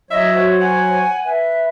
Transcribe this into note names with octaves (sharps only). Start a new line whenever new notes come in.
F#3 C#5 D#5 E5
F#4 C5
F#5 G#5
B4 E5